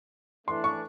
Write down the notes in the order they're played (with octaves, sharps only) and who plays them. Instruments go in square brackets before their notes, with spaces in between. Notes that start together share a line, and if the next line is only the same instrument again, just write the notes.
[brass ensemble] E3 A3 D4 [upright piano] C6
[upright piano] C#6